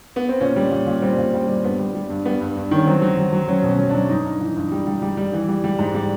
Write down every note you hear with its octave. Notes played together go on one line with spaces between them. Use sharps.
B3
C4
A#2 C#4
G3
A#2
A#2
G3 C4
A#2
G3
G3
G2 B3
G3
G3
G2
G3 B3
G2
G2
D#3 C#4
F#3 C4
F#3
F#3
F#3
F#3 C#4
B2
C#4
F#3
F#3 D4
G2 D#4
G2
E3
G2
G3
G3
G3
G3
E3
G3
G3
G#2
G3